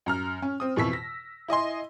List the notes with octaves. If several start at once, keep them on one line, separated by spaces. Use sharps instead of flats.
F#2 A#5 F6
C#4
C4 D#6
F2 B2 E3 C#6 E6 B6
A#6
E4 D#5 G#5 C6